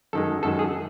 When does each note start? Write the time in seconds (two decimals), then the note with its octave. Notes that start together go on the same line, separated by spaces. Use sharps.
0.13 F#2 D#3 G#3 A4
0.43 F#2 D#3 G#3 A4
0.59 G#4